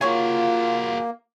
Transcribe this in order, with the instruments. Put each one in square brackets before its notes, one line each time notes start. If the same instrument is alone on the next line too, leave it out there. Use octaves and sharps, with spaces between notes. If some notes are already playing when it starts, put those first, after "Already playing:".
[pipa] D#3 C#5 G#5 [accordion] A#3 [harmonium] F4 [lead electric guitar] F#4 G#4